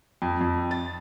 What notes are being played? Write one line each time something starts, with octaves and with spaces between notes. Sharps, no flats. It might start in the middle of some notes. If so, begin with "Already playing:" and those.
F2
F2
A6